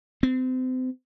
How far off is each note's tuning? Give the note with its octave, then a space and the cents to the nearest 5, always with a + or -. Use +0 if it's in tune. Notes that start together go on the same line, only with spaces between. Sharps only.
C4 -35